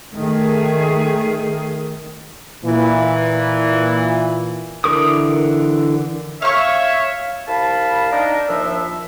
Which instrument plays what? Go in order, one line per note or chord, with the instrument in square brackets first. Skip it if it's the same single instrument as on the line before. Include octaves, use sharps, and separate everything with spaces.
[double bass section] D#3 [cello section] A3 G#4
[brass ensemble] A#2 E3
[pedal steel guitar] D3 E3 A#4 D6 D#6
[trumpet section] C#5 E5 [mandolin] F5 C#6
[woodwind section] C2 F5 A5 B5
D4 D#4 A#4 D#5
D#2 A#2 F3 D4 E5